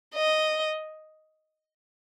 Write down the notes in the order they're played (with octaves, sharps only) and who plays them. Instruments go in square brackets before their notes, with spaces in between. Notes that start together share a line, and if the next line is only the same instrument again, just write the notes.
[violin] D#5